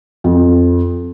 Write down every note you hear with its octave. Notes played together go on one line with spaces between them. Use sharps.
F2